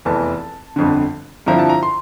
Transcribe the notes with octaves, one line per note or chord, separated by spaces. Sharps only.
F1 E2 E3 A5
G1 F2 D3
G2 D3 F3 C4 E4 A#5
A5
A#5
C6